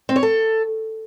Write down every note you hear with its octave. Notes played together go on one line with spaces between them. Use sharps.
C4
C#5
A4